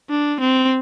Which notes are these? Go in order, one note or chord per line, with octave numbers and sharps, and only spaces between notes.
D4
C4